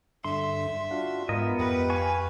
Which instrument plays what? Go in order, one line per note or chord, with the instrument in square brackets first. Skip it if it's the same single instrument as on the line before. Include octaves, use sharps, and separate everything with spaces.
[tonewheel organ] G2 D3 [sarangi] E5 [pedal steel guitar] C6
[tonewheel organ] D4 F4 F#4
[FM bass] G#2 [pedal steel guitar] B3 D#5 [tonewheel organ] F4 A#4
[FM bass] F2 [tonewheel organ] G4 [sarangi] B4
[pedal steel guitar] F5 G#5 C#6